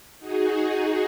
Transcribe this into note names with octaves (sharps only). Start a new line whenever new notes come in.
D#4 F#4 G#4